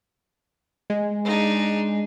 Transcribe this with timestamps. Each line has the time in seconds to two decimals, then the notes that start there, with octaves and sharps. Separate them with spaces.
0.90 G#3
1.25 D4 D#4